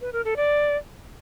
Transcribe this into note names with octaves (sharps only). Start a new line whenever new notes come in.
B4
A#4
A4
D5